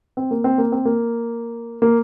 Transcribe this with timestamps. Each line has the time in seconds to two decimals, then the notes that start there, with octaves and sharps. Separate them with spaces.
0.17 C4
0.31 A#3
0.44 C4
0.58 A#3
0.72 C4
0.85 A#3
1.82 A#3